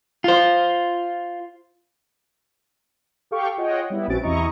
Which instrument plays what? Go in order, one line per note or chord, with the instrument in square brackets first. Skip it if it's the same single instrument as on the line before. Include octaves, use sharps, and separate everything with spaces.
[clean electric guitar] F4 C5
[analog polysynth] G4 A4 F5 G5 C#6
F4 G#4 C#5 D#5 F#5 G5
G3 B3 E4
A#1 C4 C#4 F#4 A6 D7
E2 C3 E4 D#5 A#5 C#6